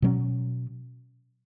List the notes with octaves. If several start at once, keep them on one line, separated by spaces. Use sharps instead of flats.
B2 F#3 C#4